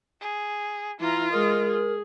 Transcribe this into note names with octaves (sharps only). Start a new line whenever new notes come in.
G#4
E3 E4 F4 A#5
G#3 A#4 D#5
G#4